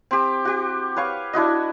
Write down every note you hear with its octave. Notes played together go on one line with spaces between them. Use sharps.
C4 G4
F#4 G4
B4 C#5 F5 C#6
D4 E4 F#4 D#5